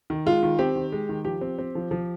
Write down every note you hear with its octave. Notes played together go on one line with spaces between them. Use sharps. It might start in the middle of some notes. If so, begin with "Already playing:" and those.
D#3
G#3 F4
D#3
C4 G4
D#3
G#3
D#3
F3 G4
C4
C4
F3
F3